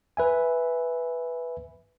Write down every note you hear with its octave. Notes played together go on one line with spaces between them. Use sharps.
B4 E5 G#5